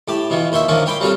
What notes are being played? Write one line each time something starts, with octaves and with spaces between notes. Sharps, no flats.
A2 G4 A5
B2 E3 F3
D#2 C5 C#5 E5 C6
D#3 F3 A#3 C#4 D4
C#5 G5 B5 C6 D6
F#3 G3 C4 F4 A4